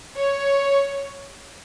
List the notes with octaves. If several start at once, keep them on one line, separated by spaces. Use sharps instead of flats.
C#5